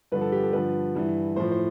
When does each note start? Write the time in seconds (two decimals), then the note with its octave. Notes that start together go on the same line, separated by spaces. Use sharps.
0.12 G2 D3 F3 B4
0.21 A4
0.32 G4
0.43 A4
0.53 G2 D3 F3 B4
0.95 G2 E3
1.36 A2 F3 C5
1.51 C5